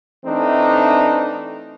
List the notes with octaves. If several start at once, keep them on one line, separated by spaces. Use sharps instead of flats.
E3 A3 C4 D4 D#4